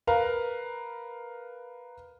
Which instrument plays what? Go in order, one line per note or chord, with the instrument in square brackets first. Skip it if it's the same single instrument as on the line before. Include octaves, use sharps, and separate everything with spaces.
[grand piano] A#4 B4 F5 A#5